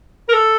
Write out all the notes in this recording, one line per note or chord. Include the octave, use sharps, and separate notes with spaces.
A#4
A4